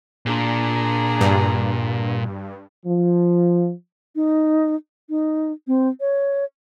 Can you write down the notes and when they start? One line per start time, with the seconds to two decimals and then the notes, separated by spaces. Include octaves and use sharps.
0.26 A#2 D4 G#4 A#5
1.21 G2
2.86 F3
4.16 D#4
5.10 D#4
5.67 C4
6.00 C#5